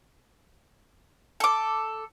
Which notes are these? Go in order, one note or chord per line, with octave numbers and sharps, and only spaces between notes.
A4 D6